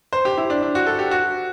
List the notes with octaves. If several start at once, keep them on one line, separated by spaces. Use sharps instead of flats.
C5
G4
E4
D4
D4
F#4
A4
G4
F#4